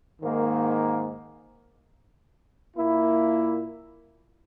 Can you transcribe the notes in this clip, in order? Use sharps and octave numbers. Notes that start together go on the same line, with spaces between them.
G#2 D#3 A#3
A#2 A#3 E4